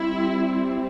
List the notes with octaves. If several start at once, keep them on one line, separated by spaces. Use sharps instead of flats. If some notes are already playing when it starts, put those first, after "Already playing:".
Already playing: G3 C4 E4